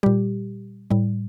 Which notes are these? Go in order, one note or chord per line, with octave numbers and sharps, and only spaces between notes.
A#2 G3 G4
A2 G3